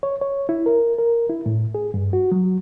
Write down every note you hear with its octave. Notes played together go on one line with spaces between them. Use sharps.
C#5
C#5
E4
A#4
A#4
E4
A2
G#4
G2
F#4
F#3